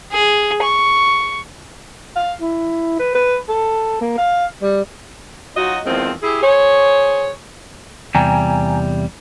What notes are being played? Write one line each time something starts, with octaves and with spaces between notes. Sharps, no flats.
G#4
C#6
F5
E4
B4
B4
A4
A#3
F5
G3
F#3 D#4 F4 F#4 D#5
E2 D#3 F3 G#3 C4
E4 G4 G#4
G#4 C5 C#5
E2 C3 G3 G5 G#5 A#5